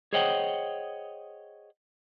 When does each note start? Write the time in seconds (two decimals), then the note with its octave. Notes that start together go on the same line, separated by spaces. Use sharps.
0.13 G#4 C5 C#5 D#5 F#5 G5